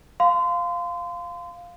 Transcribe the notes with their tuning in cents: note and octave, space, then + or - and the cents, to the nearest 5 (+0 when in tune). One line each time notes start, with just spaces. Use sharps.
F5 +0 C6 -30